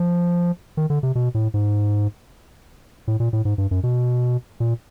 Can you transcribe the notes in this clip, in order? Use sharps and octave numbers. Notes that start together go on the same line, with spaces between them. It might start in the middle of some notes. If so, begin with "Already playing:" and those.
Already playing: F3
D#3
D3
C3
B2
A2
G#2
A2
A#2
A2
G#2
G2
F#2
B2
A#2